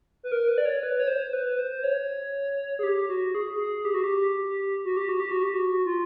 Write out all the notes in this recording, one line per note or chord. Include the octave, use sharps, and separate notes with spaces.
B4
A#4
B4
D5
C#5
B4
C#5
C5
B4
C5
C#5
G#4
G4
F#4
G#4
G#4
G4
F#4
G4
F#4
G4
F#4
G4
F#4
G4
F#4
F4